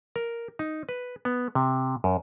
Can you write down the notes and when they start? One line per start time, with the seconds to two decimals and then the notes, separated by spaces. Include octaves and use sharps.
0.16 A#4
0.59 D#4
0.89 B4
1.25 B3
1.55 C3
2.04 F#2